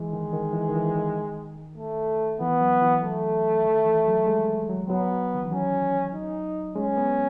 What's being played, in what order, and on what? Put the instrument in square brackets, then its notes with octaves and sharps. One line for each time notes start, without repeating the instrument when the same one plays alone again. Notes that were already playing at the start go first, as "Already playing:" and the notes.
Already playing: [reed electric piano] E3 [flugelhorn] G#3
[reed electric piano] D#3
D#3
E3
D#3
E3
D#3
[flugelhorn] A3
[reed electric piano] E3 [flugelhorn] B3
[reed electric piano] F#3
E3
[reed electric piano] F#3 [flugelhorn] A3
[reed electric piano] D#3
E3
F#3
G#3
F#3
[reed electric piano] F#3 [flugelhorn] B3
[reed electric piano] D#3
E3
[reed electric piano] F#3 [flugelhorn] C#4
[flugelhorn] D#4
[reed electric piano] G#3 [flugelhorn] C#4
[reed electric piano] B3